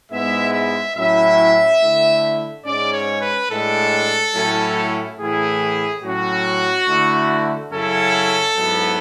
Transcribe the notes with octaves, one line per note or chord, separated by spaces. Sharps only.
G#2 G#3 B3 E4 E5
E5
A2 F#3 C#4 E4 E5
D3 A3 E4
G#2 G#3 C#4 D5
C#5
B4
A2 G#3 D4 A4
A2 F#3 A3 C#4 E4
A2 E3 A3 E4 G#4
A2 F#3 C#4 F#4
D3 A3 E4
F#2 C#3 F#3 C#4 E4 A4
G#2 F#3 B3 E4